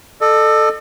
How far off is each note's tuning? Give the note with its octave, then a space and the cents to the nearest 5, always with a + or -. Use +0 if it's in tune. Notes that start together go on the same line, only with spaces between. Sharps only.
A4 +0 D#5 -45